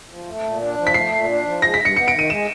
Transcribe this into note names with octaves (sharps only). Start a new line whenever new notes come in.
F3
A3
A#2
D4
F3
B6
A3 C7
A#2
D4
F3
G#3 A#6
B6
G2
C#7
B3 C#7
D7
D#3
D#7
G#3 E7